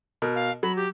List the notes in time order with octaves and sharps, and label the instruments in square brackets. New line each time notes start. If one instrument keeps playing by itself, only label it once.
[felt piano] B2 A#4
[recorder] F5
[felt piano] F#3 [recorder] B5
[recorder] G4